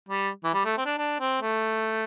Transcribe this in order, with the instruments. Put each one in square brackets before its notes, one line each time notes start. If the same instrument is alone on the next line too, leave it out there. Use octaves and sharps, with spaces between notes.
[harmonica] G3
E3
G3
A3
C4
D4
D4
C4
A3